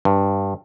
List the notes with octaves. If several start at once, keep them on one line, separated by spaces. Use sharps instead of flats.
G2